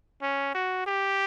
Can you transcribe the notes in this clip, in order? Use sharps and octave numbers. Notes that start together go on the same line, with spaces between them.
C#4
F#4
G4